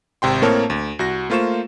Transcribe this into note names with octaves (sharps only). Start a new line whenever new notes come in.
G#1 C3 G5 C6
A2 A#3 C4 A#4 C#5 A5
D2
C2 F#4 A#6
A3 A#3 F4 C5 C#6 E7